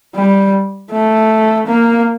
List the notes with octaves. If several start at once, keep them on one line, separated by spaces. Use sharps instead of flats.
G3
A3
A#3